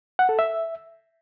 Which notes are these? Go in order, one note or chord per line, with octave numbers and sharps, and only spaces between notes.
F#5
A4
E5